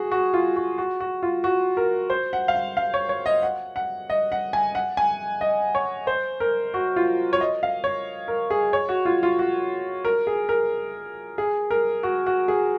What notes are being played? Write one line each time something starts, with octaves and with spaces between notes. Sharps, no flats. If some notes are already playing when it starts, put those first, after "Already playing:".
Already playing: F#4 G#4
F#4
F4
F#4
F#4
F#4
F4
F#4
A#4
C5
F#5
F5
F#5
F5
C#5
C#5
D#5
F#5
F#5
D#5
F#5
G#5
F#5
G#5
D#5
C#5
C5
A#4
F#4
F4
C#5
D#5
F5
C#5
A#4
G#4
C#5
F#4
F4
F4
F#4
A#4
G#4
A#4
G#4
A#4
F#4
F#4
G#4